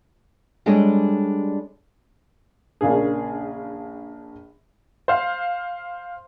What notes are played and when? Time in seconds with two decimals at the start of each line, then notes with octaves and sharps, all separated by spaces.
0.66 G3 G#3 D4 A4 C#5 D#5
2.81 A#1 C#3 A#3 D4 G#4
5.08 C5 F5